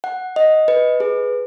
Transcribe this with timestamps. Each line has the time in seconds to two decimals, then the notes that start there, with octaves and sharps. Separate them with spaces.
0.04 F#5
0.36 D#5
0.68 B4
1.00 G#4